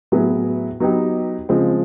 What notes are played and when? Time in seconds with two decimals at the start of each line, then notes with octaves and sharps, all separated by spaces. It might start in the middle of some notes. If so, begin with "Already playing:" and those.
0.12 A2 F#3 B3 E4 G#4
0.80 F#3 B3 D#4 G4
1.49 C#3 F3 G#3 C4